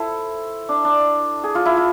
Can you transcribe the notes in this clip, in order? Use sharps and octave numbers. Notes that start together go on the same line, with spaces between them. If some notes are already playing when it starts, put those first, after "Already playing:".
Already playing: E4 A4 C5
D4
D4
G#4
F4
E4
F4